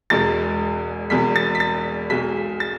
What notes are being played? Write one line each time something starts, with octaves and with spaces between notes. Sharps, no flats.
E1 E2 B2 G#3 A6
E1 E2 B2 B6
A6
B6
A6
B1 B2 G#3 B6
A6